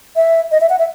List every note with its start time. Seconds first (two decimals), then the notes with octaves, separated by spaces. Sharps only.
0.16 E5
0.51 D#5
0.60 E5
0.70 F#5
0.79 E5